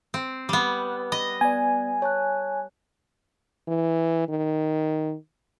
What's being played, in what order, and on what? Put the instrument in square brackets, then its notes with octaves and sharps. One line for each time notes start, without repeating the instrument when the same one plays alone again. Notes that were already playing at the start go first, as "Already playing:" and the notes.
[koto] C4
G3 B3
[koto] D#5 [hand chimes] B5
[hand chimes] B3 D5 [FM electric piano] G#5
[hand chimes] C#5 A5 F#6
[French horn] E3
D#3